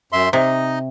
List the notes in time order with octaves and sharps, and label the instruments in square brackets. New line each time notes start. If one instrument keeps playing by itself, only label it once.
[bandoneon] F#2 E5 C6
[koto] C3 [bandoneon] D#4 D#5